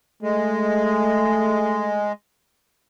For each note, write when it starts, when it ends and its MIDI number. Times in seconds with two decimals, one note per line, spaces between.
0.23 2.12 56
0.23 2.10 57